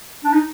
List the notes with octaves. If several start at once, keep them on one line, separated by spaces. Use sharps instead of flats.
D4
D#4